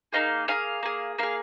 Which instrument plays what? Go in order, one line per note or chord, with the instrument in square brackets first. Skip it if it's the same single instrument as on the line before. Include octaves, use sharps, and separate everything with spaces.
[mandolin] A#3 D#4 G#4 F5
A#3 D#4 G#4 F5
A#3 G#4
A#3 G#4 F5